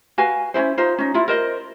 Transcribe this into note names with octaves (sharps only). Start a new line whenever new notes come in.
F#4 B4 F5 G#5
C#4 D#4 E4 C5
D#4 F4 C5
C#4 D#4
E4 F4
A#4 C5 D#5